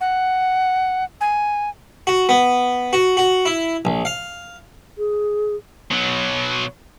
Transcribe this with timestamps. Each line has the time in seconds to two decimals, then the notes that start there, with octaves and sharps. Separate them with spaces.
0.01 F#5
1.21 G#5
2.07 F#4
2.29 B3
2.93 F#4
3.17 F#4
3.45 E4
3.85 A#1
4.05 F5
4.98 G#4
5.91 B2 F#3